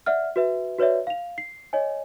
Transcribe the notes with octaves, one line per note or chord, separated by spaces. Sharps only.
D5 E5 F#5 F6
F#4 B4 E5
F#4 B4 C#5 D5 E5
F5 F7
C7
C#5 D#5 G#5